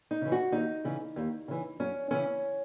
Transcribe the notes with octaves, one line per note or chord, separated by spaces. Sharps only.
D#4
C#3 E3
F#4
D#2 D#4
C#3 E3
D#2
C#3 E3
F#2 C#4
C#3 E3 C#4